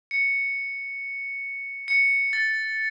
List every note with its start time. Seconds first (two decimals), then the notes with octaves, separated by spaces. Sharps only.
0.11 C#7
1.88 C#7
2.33 A6